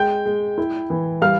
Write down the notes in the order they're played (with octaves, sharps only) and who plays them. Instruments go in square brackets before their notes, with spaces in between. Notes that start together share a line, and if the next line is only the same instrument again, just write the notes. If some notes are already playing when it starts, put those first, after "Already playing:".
Already playing: [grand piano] G#3 G5 G6
G#3
E4
E3
G3 F5 F6